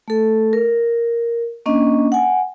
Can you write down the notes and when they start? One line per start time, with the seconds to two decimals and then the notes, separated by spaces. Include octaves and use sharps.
0.08 A3 A4
0.53 A#4
1.66 A#3 C#4 D4 D#5
2.12 F#5 G#5